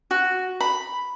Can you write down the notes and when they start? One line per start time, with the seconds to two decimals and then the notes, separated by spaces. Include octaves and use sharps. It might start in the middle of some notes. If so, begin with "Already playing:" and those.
0.11 F#4
0.60 B5